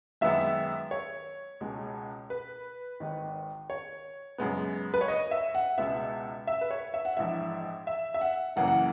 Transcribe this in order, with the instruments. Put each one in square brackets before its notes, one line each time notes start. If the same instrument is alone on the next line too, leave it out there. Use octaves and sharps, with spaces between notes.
[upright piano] F#2 D#3 G#3 B3 E5
C#5
C#2 B2 G#3
B4
G#1 G#2 D#3
C#5
F#2 C#3 G#3 B3
B4
C#5
D#5
E5
F#5
C#2 B2 G#3 B3 E5
E5
B4
C#5
E5
F#5
A#1 G#2 E3 E5
E5
E5
F#5
F#1 F#2 C#3 E3 A#3 F#5
F#5